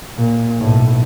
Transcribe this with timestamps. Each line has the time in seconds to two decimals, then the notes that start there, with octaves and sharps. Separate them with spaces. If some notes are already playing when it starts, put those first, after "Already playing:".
0.16 A#2
0.59 B1 A2